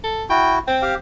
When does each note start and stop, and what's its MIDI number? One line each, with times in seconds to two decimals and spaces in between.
0.04 0.25 69
0.30 0.59 64
0.30 0.59 66
0.30 0.56 79
0.67 0.95 60
0.67 0.82 79
0.82 0.95 67
0.82 0.95 77